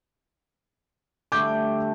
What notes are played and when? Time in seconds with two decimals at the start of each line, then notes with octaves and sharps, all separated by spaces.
1.32 D3 G3 A3 D6 G6